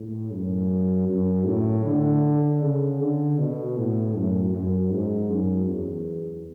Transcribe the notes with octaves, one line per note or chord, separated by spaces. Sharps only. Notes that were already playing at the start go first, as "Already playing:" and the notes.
Already playing: A2
F#2
F#2
A2
D3
C#3
D3
B2
A2
F#2
F#2
G#2
F#2
E2